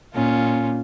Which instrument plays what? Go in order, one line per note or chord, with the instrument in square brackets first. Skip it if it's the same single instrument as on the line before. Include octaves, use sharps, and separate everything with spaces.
[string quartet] A#2 [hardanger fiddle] C#4 F4